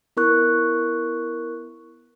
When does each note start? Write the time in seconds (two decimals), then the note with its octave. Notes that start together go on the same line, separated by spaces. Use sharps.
0.17 B3 E4 A#4 C#6 F#6